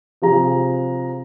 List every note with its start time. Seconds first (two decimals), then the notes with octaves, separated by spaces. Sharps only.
0.22 C3 F3 G#4 A#5